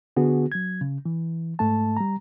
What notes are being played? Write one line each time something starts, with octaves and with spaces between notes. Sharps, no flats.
D3 B3 F#4 G#4
F#3 G#6
C#3
E3
G#2 A3 A5
G3 A#5